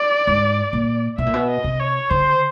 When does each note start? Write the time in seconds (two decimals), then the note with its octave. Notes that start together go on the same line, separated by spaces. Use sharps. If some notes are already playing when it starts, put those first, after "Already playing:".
Already playing: D5
0.27 G#2
0.73 A#2
1.18 B2 E5
1.26 A#2
1.34 B2
1.50 D#5
1.64 C3
1.80 C#5
2.10 D3 C5